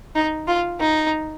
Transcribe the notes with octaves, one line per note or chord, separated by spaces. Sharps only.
D#4
F4
D#4